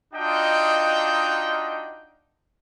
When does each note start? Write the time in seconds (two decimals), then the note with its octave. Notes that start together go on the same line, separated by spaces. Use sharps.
0.13 D4 D#4 F4 F#4 D#5 G5